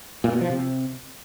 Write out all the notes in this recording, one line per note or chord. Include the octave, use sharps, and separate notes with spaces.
A#2
B2
F3
C3